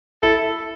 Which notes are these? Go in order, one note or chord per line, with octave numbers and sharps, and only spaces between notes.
E4 A4